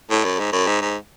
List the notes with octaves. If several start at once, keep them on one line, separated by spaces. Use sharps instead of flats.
A2
F#2
G#2
F#2
G#2
G#2